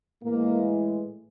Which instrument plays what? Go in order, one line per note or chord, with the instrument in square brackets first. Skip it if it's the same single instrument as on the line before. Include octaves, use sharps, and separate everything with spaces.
[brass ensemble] A2 E3 G#3 A#3